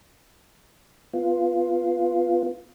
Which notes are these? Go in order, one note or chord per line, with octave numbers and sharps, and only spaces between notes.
B3 F4